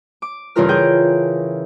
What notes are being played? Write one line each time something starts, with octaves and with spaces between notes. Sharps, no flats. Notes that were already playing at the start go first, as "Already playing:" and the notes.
D6
G2 C#3 E3 F4 A#4 F6
G#4 G5 G6